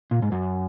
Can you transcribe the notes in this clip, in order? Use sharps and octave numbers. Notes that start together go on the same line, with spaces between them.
A#2
G#2
F#2